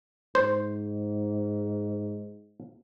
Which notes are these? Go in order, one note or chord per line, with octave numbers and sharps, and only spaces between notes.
G#2 C5